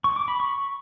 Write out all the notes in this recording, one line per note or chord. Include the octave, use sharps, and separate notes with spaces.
C#6
D6
B5
C#6